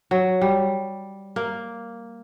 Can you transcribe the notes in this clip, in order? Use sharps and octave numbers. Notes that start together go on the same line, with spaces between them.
F#3
G3
A#3